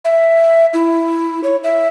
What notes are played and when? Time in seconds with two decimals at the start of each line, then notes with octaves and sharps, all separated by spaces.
0.05 E5
0.73 E4
1.43 C#5
1.64 E5